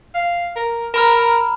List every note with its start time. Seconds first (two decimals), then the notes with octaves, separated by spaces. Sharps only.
0.15 F5
0.56 A#4
0.94 A#4 A#5 B5 F6